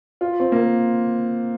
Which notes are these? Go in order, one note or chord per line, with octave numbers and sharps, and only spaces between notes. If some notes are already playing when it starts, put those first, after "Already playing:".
F4
C4
A#3